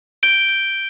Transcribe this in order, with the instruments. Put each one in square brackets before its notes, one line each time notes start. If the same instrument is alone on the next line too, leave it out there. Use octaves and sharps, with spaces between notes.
[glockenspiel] G6 D7 G7
G6